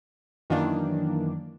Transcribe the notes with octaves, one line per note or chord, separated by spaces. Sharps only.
F#2 D#3 E3 A#3 D4